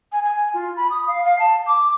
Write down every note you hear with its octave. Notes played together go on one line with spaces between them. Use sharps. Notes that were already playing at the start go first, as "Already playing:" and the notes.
G#5
G#5
F4
B5
D#6
F5
F5
A5
D6